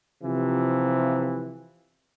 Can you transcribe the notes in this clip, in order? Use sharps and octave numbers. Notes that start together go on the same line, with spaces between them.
C3 E3 F3